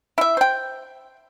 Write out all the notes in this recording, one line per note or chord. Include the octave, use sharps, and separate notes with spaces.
E4 E5
C5 G5